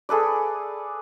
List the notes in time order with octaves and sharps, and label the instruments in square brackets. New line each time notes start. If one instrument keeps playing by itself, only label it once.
[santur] G#4 A4 B4 D5